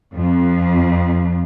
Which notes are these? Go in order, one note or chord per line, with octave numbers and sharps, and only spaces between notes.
F2